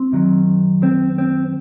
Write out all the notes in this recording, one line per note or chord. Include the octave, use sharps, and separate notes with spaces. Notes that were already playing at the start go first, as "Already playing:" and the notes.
Already playing: C4
F#2 D#3 F#3
C4
C4